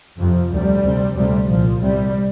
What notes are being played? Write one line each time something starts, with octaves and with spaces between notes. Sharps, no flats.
F2 C3 F3
D2 C3 G3
D2 C3
D2 C3 G3
C2 A#2 F3
C2 C3 G3